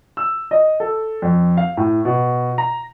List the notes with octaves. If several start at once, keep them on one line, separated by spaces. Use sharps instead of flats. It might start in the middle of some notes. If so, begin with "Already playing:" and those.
E6
D#5
A4
F2
F5
A2
B2
A#5